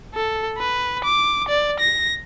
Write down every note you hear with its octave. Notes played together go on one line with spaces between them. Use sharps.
A4
B4
D6
D5
A#6